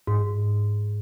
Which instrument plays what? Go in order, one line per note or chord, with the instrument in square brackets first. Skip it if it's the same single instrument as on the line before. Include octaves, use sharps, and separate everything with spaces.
[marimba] G#2